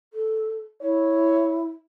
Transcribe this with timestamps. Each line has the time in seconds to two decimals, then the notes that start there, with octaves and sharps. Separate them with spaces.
0.13 A4
0.82 E4 C#5